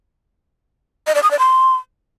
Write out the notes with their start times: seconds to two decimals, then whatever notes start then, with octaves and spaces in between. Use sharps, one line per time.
1.07 D#5
1.15 D5
1.23 D#6
1.31 D5
1.39 C6